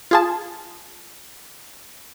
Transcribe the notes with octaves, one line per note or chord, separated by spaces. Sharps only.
F4 G#4 A5